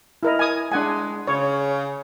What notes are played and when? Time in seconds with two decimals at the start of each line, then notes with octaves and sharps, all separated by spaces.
0.23 E4 A#4 D#5
0.39 G#5 D#6
0.72 G#3 D4 F#5 G#5
1.27 C#3 C#5